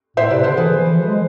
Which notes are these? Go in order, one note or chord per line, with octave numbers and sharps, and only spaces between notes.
A2 C5 E5
C3 B4 D5
D3 A4 C5
E3 G#4 B4
F3
E3
F3
G#3